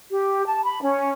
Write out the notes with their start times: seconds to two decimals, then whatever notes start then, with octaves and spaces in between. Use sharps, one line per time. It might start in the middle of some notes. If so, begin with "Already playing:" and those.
0.10 G4
0.46 A5
0.64 B5
0.82 C#4